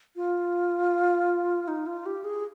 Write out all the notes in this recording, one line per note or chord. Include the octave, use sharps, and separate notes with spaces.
F4
D#4
F4
G4
G#4